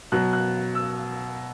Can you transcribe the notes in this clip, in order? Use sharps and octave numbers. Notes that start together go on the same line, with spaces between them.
B2 F#3 F#6
F#6
E6